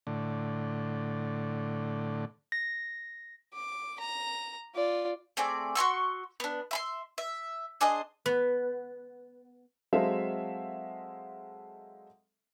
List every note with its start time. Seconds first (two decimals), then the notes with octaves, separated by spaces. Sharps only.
0.07 A2 D3
2.52 A#6
3.54 D6
4.00 A#5
4.75 F4 D5
5.37 A3 C4 G#4 D5
5.75 F#4 C6 C#6 E6
6.40 B3 D4
6.71 E5 B5 C6
7.18 E5
7.81 D4 G#4 C5 D#5
8.26 B3
9.93 F#3 G#3 C4 A4 E5 F5